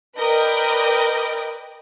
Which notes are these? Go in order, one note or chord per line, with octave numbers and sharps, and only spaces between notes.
A#4 B4 D5 D#5 G5